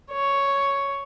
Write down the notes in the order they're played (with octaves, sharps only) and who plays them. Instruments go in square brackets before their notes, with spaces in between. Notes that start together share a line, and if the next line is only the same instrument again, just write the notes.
[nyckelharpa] C#5